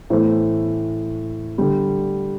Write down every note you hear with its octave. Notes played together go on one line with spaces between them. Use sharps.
A2 E3 A3 C5
D3 G3